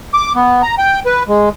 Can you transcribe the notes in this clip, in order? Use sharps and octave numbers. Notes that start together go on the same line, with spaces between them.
D6
B3
A#5
G5
B4
G#3